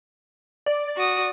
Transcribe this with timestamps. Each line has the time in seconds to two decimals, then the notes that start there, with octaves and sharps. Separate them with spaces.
0.66 D5
0.96 F#4 D#6